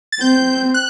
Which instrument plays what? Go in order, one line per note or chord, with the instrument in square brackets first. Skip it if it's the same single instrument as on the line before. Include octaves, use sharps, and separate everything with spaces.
[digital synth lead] A6
[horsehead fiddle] C4 [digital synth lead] G6
[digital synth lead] F#6